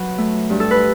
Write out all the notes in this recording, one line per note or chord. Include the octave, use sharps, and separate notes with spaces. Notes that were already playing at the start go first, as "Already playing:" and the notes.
Already playing: F#3 B4
A3
G2
A4
B4